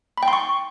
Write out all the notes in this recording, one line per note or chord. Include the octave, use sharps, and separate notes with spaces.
B5
G5
C6
C#6